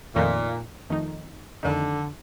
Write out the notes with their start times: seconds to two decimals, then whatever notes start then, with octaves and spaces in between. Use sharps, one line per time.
0.16 F2 A#2 D#3 A3 D#4
0.90 F2 D#3 A3 D#4
1.63 F2 D3 D#3 A3 D#4